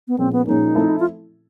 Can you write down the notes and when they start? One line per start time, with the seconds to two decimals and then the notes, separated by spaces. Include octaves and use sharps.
0.08 B3
0.18 A#2 F3 G#3 C4 C#4
0.33 B3
0.47 A#2 F3 G#3 C#4 D#4
0.75 F3 A3 C4 E4 A4
1.00 F4